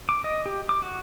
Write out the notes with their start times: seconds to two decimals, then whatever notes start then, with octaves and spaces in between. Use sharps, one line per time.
0.09 D6
0.24 D#5
0.46 G4
0.69 D6
0.82 F#4